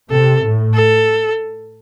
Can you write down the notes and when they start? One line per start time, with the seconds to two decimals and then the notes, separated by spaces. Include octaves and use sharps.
0.11 C3 A4
0.43 A2
0.74 A4